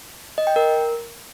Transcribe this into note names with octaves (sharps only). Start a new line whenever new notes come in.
D#5
G5
A#4